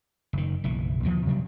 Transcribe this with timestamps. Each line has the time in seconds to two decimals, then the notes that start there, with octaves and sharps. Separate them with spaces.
0.33 F#1 D#3
0.64 F#1 B1 E3
1.03 D#2 D3 E3 F3
1.26 C3 F#3 G3 D4